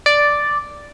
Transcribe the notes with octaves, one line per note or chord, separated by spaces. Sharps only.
D5